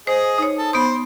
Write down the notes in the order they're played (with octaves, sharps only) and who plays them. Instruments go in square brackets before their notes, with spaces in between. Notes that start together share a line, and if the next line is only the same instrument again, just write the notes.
[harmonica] G#4 D#5 [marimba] C5
[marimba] D#4 C#5
[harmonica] A4
[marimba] B3 B5 D#6 [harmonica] C5